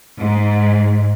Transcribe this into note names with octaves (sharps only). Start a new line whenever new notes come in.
G#2